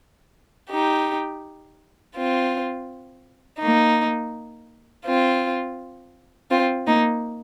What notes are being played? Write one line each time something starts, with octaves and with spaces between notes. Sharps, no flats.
D#4 G4
C4 F4
A#3 D#4
C4 F4
C4 F4
A#3 D#4